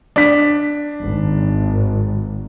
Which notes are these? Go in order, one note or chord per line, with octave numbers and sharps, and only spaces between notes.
D4 B6
G#1